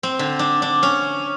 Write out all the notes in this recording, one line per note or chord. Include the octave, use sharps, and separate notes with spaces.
C4
D3
D4
D4
C#4